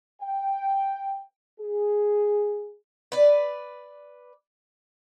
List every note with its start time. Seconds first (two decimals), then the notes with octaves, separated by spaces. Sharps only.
0.22 G5
1.60 G#4
3.12 B4 D5